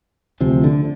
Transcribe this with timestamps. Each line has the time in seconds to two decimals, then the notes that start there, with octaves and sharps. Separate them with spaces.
0.41 D2 C3 F3
0.64 D3